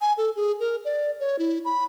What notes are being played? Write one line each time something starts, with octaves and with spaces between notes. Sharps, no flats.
G#5
A4
G#4
A#4
D5
C#5
E4
B5